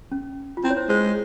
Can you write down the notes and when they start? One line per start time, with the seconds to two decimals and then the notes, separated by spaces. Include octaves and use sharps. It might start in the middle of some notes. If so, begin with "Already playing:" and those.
0.12 C#4
0.57 F4
0.64 C4 E4
0.70 C#5
0.77 C5
0.89 G#3 C5